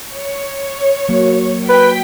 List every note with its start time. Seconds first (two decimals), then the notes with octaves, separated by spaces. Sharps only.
0.13 C#5
1.09 F#3 A#3
1.69 B4 G5 B6